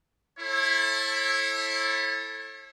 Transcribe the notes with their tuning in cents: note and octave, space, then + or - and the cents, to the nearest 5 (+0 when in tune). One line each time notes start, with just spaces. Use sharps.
E4 +0 A4 +0 C#5 -40